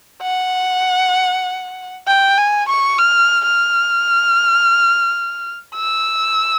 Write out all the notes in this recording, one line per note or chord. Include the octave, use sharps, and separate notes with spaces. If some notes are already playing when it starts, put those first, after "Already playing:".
F#5
G5
G#5
C#6
F6
F6
E6